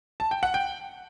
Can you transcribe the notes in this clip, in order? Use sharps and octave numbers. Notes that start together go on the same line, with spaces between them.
A5
G5
F#5
G5